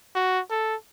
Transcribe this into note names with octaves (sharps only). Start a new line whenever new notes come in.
F#4
A4